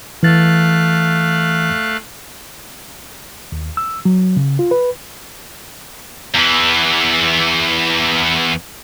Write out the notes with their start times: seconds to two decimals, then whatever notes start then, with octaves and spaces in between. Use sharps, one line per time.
0.23 E3 A3 F5 F#6 A6
3.52 D#2
3.77 E6
4.05 F#3
4.37 C#3
4.59 F4
4.71 B4
6.34 E2 E3